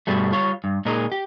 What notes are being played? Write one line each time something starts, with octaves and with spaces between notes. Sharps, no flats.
G2 B2 G3 A3
G3 F4 C#5
G2
A#2 G#3 D#4 A#4
G4